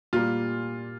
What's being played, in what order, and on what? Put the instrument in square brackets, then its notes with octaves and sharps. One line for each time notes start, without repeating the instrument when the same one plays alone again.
[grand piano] A#2 G3 A#3 F4